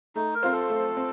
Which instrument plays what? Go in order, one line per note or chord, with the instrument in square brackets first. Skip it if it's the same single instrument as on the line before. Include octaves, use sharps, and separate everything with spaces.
[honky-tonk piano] A3 [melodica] D#4
[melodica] A#4
[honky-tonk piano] C4 F4 C5
[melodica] A4
[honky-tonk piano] A3
C4